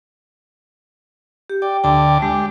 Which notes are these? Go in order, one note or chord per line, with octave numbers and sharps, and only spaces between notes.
G4
D5 G5
D2 D3 D5 G5 A5
G#3 G4